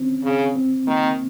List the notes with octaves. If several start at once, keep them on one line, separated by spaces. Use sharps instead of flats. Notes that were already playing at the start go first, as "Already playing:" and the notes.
Already playing: C4 C#4
C#3
C4
D#3 A#3